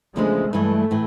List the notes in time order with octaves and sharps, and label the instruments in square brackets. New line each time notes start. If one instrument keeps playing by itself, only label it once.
[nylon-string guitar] E2 C#3 F3 A3 D4 [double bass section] G#3
[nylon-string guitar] G2 E3 G#3 [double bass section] A3
[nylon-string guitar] A2 E3